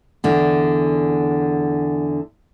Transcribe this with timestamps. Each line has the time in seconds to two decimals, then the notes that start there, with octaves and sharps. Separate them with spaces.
0.24 E2 D3